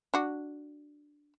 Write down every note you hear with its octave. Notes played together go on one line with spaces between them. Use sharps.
D4 F#4